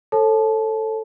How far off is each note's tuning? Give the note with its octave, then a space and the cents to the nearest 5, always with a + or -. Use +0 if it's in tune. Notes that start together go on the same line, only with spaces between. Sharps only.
A4 +5 C#5 -40 A5 -25